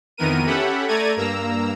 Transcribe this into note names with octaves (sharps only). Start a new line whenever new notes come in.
F2 D#3 E3 B3 A#4 D#7
C#4 G4 A4 E5 F#5 B5
A3 A4 D5 A#5 G#6 D#7
G2 A#3 A#5 E6